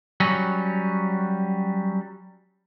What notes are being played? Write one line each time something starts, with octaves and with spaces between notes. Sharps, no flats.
F#3 G3 C#4